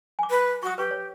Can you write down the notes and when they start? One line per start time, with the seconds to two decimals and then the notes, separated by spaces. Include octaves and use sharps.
0.19 G#5 D6
0.30 B4
0.63 F#4 C#6 D#6
0.78 G4 B4 C#6
0.91 C#5